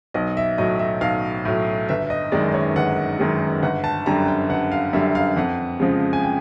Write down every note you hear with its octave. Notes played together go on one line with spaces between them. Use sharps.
B1 D#5
E5
A2 F#3 D#5
E5
B1 F5
A2 F#3
G1 E5
D#5
F#2 D#3 G#3 D5
C#5
G1 F#5
F#2 D#3 G#3
G1 F#5
A5
F#2 D3 G3 A#5
G5
G1 F#5
F5
F#2 D3 G3 E5
F5
F2 F#5
C#3 F3 G#3
G#5
G5